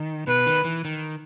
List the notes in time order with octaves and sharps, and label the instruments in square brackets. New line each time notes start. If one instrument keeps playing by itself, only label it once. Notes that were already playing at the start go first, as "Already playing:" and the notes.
Already playing: [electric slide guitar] D#3
[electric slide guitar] B2 [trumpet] B4
[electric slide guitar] D#3
E3
D#3